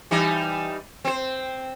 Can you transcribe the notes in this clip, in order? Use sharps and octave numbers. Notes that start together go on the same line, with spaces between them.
E3 G3 D#4
C4 C5